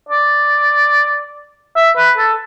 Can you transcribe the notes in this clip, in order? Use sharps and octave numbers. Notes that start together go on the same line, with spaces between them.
D5
E5
B4
A4